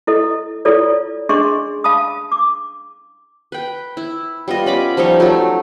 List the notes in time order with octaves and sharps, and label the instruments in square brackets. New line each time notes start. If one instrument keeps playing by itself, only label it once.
[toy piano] E4 A4 D#5
E4 F4 A4 C#5 D5
C#4 D4 G#4 D#5 C6 C#6
F5 A5 B5 D#6
D6
[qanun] B4 G5
E4
G3 B3 F4 D#5
C#4 B5 D6
F3 G3 D#4 C#5
F#3 A3